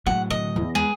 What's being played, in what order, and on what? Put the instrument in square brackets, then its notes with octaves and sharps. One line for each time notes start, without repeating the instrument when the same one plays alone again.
[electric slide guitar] A2 F#3 [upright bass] G#3 A#3 [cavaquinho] F#5
[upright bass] D3 [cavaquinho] D#5
[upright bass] E2
[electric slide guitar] G#3 B4 [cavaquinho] G#4